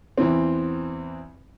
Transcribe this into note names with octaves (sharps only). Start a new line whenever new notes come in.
E2 E3 C4